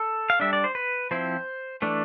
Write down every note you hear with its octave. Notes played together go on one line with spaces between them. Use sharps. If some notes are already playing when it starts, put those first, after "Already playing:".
Already playing: A4
F5
G3 D4 E5
D5
C5
B4
F3 C4 E4 C5
E3 A3 D4